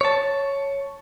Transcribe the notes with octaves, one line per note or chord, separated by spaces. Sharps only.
C#5 A5